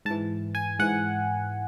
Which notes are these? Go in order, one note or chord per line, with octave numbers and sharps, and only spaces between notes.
G#2 A5
E3
G#5
G#2 E3 F#5